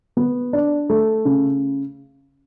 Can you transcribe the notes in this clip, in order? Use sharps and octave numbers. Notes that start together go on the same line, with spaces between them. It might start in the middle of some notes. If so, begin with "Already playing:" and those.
B3
D4
A3
C#3